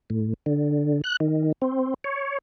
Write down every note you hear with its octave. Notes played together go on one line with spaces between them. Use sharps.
A2
D3
F#6
D#3
C4
C#5